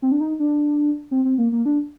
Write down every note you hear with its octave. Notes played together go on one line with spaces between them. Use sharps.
C4
D4
D#4
D4
C4
C4
A#3
A#3
D4